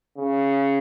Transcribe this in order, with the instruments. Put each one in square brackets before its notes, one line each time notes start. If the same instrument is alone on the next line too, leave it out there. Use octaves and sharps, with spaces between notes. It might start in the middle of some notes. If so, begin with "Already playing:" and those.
[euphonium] C#3